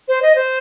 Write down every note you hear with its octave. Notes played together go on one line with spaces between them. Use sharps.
C5
D#5
C5